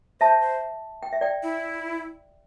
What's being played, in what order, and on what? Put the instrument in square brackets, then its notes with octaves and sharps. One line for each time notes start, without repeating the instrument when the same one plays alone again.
[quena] C5 [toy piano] E5 A5
[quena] C5
[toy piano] G5
E5
D5 G5
[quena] E4